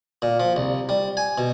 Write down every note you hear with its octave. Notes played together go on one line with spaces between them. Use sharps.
A#2
F3
C2
G3
G#5
B2